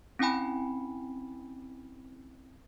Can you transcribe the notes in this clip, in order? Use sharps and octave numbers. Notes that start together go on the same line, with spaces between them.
C4 C#4 E4 G5 G#5 B5